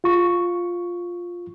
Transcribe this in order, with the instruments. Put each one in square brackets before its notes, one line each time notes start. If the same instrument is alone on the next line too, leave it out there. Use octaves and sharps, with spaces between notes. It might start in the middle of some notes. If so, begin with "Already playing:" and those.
[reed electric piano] F4 C#6